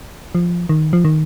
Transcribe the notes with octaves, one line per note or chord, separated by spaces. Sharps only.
F3
D#3
F3
D#3